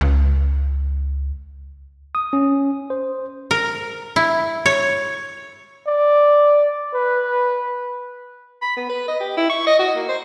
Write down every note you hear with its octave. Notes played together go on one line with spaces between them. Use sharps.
C#2
D#6
C#4
C5
A#4
E4
C#5
D5
B4
B5
B3
B4
D#5
G4
E4
C#6
D#5
F#4
A#3
C5